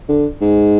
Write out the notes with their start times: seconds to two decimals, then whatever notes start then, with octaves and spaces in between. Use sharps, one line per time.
0.08 D3
0.41 G#2